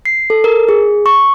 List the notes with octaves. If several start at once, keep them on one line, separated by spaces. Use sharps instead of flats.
C7
A4
A#4
G#4
C#6